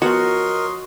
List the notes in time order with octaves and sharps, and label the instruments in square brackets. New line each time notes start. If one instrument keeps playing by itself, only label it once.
[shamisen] F3 B3 [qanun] F#4 [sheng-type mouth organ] A#4 [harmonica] C#5 D#5 C6